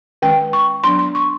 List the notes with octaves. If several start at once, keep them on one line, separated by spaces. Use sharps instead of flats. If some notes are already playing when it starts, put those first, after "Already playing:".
D#3 G#3 C#4 G5
C#6
F#3 B3 D4 C6
C6
C#6